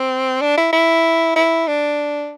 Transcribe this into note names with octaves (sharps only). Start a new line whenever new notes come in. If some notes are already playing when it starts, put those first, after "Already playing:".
Already playing: C4
D4
E4
E4
E4
D4